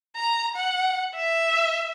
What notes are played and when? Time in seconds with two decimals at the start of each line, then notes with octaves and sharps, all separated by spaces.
0.16 A#5
0.55 F#5
1.15 E5